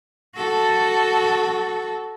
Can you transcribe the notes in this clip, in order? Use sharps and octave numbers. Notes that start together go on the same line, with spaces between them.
F#4 A4